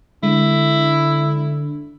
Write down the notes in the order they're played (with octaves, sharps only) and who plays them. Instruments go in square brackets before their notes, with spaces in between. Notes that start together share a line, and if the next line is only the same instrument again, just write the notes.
[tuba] D3 [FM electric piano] G#3 [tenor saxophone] E4